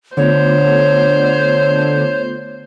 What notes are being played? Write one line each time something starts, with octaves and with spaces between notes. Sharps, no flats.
D3 A3 B3 F4 C5 C#5